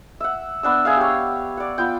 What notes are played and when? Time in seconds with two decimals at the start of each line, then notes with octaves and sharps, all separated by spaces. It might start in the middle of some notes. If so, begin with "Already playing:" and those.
0.20 E5 F#5
0.63 B3 D4 E6
0.85 G#4 E5 F5
0.97 G4 C#5
1.57 D5 F#5
1.78 B3 F4 G5